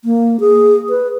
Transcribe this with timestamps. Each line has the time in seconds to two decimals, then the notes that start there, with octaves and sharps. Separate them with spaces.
0.05 A#3
0.40 G#4
0.89 B4